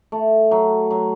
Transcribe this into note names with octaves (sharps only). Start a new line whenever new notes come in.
A3
F#3
F#3